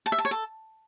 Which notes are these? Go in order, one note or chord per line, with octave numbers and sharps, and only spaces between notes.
A5
E5
A5
C#5
A4